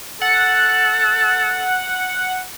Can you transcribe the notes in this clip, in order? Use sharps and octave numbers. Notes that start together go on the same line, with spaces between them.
A4 F#5